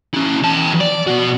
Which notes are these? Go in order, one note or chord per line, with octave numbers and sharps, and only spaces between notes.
C#4 E4
E2 A5
D5
B2 F#4